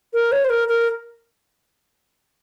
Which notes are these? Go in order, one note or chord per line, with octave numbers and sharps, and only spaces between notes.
A#4
C#5
C5
A#4
A#4